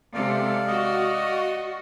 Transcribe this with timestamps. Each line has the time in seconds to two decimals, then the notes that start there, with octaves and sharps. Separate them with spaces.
0.14 C3 G#3 A4 D5 F5
0.68 F#4 D#5